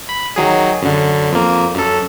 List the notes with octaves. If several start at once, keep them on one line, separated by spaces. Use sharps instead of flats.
B5
D#3 F#3 G#4
F#2 D3
F2 A#3
F#2 A4